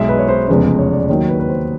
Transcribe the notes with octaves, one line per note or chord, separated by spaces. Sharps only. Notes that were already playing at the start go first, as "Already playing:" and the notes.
Already playing: B1 B2 G#3 E5
B4
C#5
C5
F1 E2 C#3 F3 G#3 B4
C#5
D5
D#2 D#3 F#3 C#5
B4
B4
C5